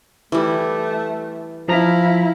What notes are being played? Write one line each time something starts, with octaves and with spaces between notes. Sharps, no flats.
E3 G3 A3
F3 E4 F5 A#5 A#6